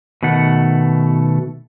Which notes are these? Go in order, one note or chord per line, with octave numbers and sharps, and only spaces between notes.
B2 D#3 A3 F#5